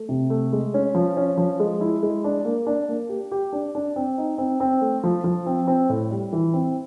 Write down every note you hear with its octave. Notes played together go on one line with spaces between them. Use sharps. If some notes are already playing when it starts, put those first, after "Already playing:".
Already playing: A3
C3
A3
G#3
C#4
F3
C#4
F3
G#3
E4
G#3
D4
A#3
D4
A#3
G4
G4
D4
D4
C4
D#4
C4
C4
A3
F3
F3
C4
C4
A2
G3
E3
C4